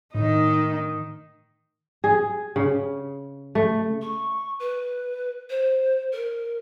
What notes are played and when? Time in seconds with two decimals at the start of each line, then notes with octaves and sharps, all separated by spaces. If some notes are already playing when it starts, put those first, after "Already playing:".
0.15 A2 D#3 D#4
2.04 G#4
2.56 C#3
3.55 A3
4.01 C#6
4.60 B4
5.50 C5
6.12 A#4